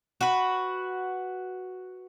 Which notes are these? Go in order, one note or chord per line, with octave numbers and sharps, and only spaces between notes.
F#4 B4